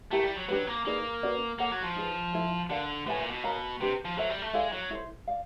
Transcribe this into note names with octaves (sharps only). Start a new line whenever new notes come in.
A3 E4 G4 A#4
G3
F#3
F#3 D4 G4 B4
A#3
A#3 D#4 G#4 B4 D5
C#4 F#4 B4 D5
A#3 A4 C#5 F#5 A5
F#3
F3
D#4 G#4 B4
E4 A4 C5
D3 A#4 D5 F5
A2 B4 E5 G#5
A#2
B2
A#4 C#5 F5 A#5
C3 D4 G4 B4
F3
F#3 A4 C5 E5
G3
A3
G#3 E4 A4 D5 F5
F#3
E4 A4 C5
D5 F5